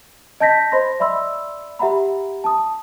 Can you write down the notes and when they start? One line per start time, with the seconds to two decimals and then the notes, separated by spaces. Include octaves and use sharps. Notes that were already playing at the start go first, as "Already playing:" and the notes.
0.40 D#5 A5 G6 A#6 B6
0.72 C5 D#5 B5 C6 A#6
1.00 D5 E5 B5 C6 E6
1.79 G4 E5 F#5 A#5 B5
2.44 A5 D#6